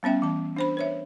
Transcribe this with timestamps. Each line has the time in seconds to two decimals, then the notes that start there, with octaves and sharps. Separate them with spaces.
0.03 G3 B3 C#4 E5 G5
0.22 E3 A5
0.56 D4 C5 B5
0.77 B4 C#5 E5